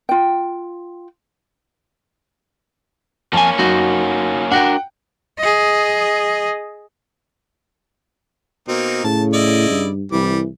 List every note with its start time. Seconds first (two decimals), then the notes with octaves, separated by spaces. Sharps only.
0.09 F4 G5
3.33 F2 A#3 C#4 G#5 A5
3.59 F#2 D#4 F#4
4.52 D4 F#4 A#4 F#5 G5
5.39 G#4 D#5
8.68 B2 A#3 C4 D#4
9.04 A2 C#3 A5
9.33 E4 D5 D#5
9.71 G2
10.12 C2 E3 G3 D6